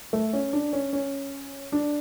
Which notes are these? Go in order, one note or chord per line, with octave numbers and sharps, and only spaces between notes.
A3
C#4
D4
C#4
C#4
D4